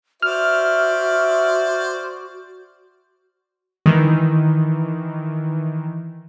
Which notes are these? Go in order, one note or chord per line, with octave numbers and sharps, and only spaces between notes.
F#4 C5 D5 E5 F6
D#3 E3